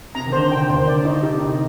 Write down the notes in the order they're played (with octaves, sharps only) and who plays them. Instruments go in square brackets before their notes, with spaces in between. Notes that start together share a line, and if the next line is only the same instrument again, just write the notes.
[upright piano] C3 [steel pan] A#5
[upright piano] D#3
[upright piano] D3 [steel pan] C5
[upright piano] D3 [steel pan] G5
[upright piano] D#2 D#3 [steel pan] C5
[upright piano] D3 [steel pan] D5
[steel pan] D#4
[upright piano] D3 [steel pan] G4
[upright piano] C3
[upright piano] D3 [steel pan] D#4